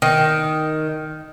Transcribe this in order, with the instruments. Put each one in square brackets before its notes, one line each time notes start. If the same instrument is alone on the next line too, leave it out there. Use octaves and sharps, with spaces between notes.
[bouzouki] D#3